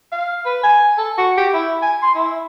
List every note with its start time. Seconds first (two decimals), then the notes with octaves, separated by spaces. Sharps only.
0.12 F5
0.45 B4
0.63 G#5
0.98 A4
1.18 F#4
1.37 G4
1.54 E4
1.82 G#5
2.02 C6
2.15 E4